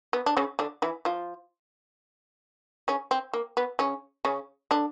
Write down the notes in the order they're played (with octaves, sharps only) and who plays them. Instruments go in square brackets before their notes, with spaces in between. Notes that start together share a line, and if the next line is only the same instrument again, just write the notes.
[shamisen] B3
D4
C#3 C#4
D3 D4
E3 E4
F3 F4
C#3 C#4
C4
A#3
B3
C#3 C#4
C#3 C#4
D3 D4